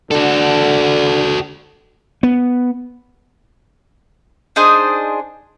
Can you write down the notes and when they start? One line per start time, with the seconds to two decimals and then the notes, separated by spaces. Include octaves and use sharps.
0.11 D3 F#4 A4
2.23 B3
4.56 D4 D#4 G#4 C5